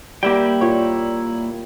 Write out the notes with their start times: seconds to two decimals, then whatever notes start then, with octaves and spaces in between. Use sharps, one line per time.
0.23 G3 A#3 E4 G4 G5
0.61 A#2 C#5